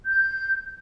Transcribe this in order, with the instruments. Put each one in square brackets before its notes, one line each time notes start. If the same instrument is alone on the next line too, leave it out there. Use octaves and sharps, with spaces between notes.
[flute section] G6